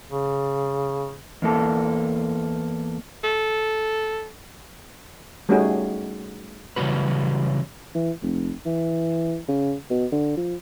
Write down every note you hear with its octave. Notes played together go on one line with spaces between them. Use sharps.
C#3
E2 A#3 A4
A4
G3 A3 C#4 D#4 F#4 G#4
C#3 E3 F#3 G3 F#4 B4
E3
F1
E3
C#3
B2
D3
F3